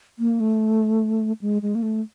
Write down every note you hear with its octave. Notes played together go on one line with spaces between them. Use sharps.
A#3
A3
G#3
G#3
A#3
A3